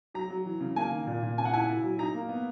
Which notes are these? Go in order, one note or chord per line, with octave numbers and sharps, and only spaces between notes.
F#3 A#5
F#3
E3
C#3
A#3 G#5
D#3
A#2
A#2
C#3 G#5
F#5
E4 G#5
E4
F#3
D#4 A#5
A#3
B3